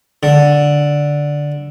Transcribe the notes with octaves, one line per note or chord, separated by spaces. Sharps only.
D3